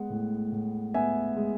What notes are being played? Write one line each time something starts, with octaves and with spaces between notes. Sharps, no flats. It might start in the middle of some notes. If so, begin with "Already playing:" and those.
Already playing: G#3 B3 F#5
A2
A2
B3 E5 G#5
G#3